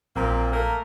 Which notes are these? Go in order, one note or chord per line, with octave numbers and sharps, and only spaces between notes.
A#1 A#2 A#3 C4 A#5
A3 A#3 A#4